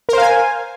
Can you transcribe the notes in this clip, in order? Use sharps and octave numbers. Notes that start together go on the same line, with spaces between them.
A#4 C5 F5 G#5